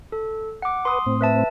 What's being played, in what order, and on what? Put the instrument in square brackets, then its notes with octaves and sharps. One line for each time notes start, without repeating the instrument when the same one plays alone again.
[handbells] A4
F#5 D6
[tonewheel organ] B4 [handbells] C6 D#6
[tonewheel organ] A2 C4
[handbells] B4 E5 A5